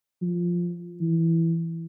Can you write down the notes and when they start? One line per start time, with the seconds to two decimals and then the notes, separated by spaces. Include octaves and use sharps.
0.22 F3
1.01 E3